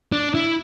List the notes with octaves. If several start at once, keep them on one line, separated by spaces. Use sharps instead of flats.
D4
E4